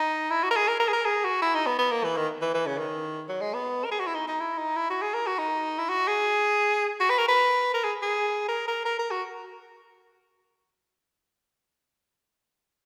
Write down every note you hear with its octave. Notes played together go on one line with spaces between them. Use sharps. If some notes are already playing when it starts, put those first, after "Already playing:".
Already playing: D#4
E4
F#4
A#4
G#4
A#4
A#4
G#4
A#4
G#4
F#4
E4
D#4
B3
B3
A#3
E3
D#3
E3
E3
C#3
D#3
F#3
G#3
B3
A#4
G#4
F#4
E4
D#4
D#4
E4
D#4
E4
F#4
G#4
A#4
F#4
D#4
E4
F#4
G#4
F#4
B4
A#4
B4
A#4
G#4
G#4
A#4
A#4
A#4
A#4
F#4